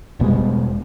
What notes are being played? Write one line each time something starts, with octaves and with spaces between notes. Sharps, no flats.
E1 B2 G3 G#3